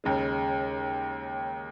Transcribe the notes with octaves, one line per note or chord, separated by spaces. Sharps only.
D#2 C#3 G#3